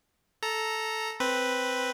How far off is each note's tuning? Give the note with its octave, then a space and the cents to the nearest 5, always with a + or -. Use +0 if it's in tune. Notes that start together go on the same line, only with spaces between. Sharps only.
A4 -5 A#5 +0
C4 +0 B4 +0